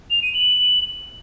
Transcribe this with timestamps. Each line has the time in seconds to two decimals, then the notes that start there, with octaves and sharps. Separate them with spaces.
0.11 F7
0.22 D#7
0.34 F#7